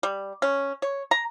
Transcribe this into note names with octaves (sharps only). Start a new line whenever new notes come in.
G3
C#4
C#5
A#5